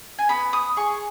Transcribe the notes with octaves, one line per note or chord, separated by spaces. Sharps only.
G#5
B3 B5
D#6
G#4 C#6